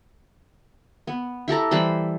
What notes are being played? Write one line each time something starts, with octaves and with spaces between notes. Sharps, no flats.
B3
E4 G4 A4 A#5
E3 G3 C5 B5